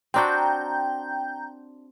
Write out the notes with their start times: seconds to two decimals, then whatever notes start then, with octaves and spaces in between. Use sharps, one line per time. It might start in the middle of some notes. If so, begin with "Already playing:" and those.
0.14 C4 D4 F#4 G5 A#5 G6